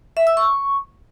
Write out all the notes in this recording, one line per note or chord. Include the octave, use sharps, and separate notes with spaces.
E5
E6
C#6